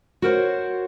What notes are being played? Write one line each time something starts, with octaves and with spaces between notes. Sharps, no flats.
F#4 A#4 C5 C#5